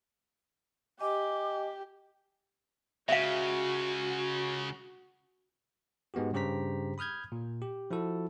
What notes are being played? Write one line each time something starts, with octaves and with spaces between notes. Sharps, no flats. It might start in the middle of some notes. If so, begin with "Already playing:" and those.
G4 D#5 G#5 D6
C#2 C#3 F#4 E5 F5
G#2 G#3 B3 F#4 G4
G2 C#3 G4 C5 A#5 B6
B5 D#6 F6 G6 G#6
A#2
G4
F3 E4 F#4 A4